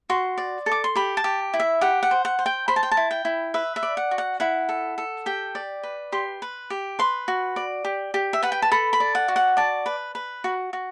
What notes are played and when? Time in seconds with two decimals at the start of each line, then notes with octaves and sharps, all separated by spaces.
0.10 F#4 C6
0.38 D5
0.66 A4
0.71 D6
0.84 C6
0.96 G4 B5
1.17 A5
1.24 G4
1.54 E4
1.60 E5
1.81 G4 F#5
2.03 F#5
2.11 C5
2.25 F#5
2.39 C5
2.46 G5
2.68 C5 B5
2.76 A5
2.83 G5
2.91 A5
2.97 E4
3.11 G5
3.25 E4
3.54 B4 E5
3.76 E5
3.83 D5
3.97 F#5
4.11 F#4
4.18 F#5
4.40 E4 F#5
4.69 A4
4.98 A4
5.26 G4 G5
5.55 D5
5.83 B4
6.12 G4 C6
6.42 B4
6.70 G4
6.99 B4 C6
7.28 F#4
7.56 D5
7.84 G4
8.14 G4
8.33 E5
8.42 B4 F#5
8.52 G5
8.62 A5
8.72 A4 B5
8.93 B5
9.00 D5
9.15 F#5
9.28 F#4
9.36 F#5
9.57 D5 A5
9.86 B4
10.15 B4
10.44 F#4
10.73 F#4